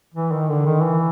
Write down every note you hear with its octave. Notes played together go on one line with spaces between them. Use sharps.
E3
D#3
D3
D#3
E3